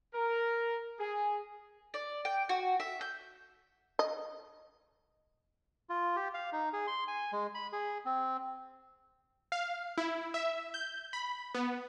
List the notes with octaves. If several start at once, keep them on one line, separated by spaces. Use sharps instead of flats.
A#4
G#4
D5
G5
F#4
E5
G6
D#5
F4
G4
F5
D#4
G#4
C6
G#5
G#3
B5
G#4
C4
F5
E4
E5
G6
B5
B3